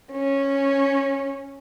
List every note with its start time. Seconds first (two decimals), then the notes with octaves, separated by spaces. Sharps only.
0.12 C#4